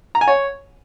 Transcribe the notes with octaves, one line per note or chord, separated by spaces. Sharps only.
A#5
G#5
C#5